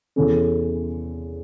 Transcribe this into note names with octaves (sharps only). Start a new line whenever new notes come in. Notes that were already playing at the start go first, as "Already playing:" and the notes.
E2 E3 C#4 A4